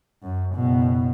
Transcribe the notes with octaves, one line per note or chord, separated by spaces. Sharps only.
F#2
F#1 B2